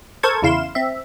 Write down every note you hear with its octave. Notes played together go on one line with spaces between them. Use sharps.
A4 A#4 C5 A5 C#6 G#6
E2 C#3 E4 F5 C6 E7
C4 E5